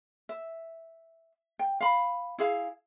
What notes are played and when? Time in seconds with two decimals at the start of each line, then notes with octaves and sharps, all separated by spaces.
0.29 E5
1.59 G5
1.81 F5 B5
2.38 E4 G#4 F5